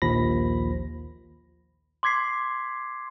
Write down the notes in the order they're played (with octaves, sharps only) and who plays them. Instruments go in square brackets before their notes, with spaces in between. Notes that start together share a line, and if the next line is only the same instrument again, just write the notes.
[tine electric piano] A#1 D#2 F3 B5 A#6
[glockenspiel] C6 D6 G#6 B6 C7